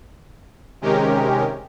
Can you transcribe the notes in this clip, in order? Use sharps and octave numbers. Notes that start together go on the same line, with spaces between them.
C3 D#3 G#3 C#4 G4 A#4